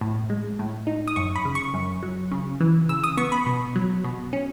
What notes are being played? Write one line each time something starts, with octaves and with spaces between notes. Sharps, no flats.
A2
G#3
A2
D#4
D#6
F#2 C#6
B5
C#3
C#6
F#2
F#3
C#3
E3
C#3 E6
D#6
B3 C#6
B5
B2
F#3
B2
C#4